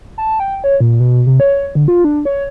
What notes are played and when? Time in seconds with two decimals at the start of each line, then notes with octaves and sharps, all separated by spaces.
0.18 A5
0.40 G5
0.64 C#5
0.80 A#2
1.00 B2
1.27 C3
1.40 C#5
1.75 D3
1.88 F4
2.04 D4
2.25 C#5